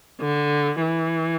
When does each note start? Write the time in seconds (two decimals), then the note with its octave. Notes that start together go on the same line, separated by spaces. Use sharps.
0.21 D3
0.82 E3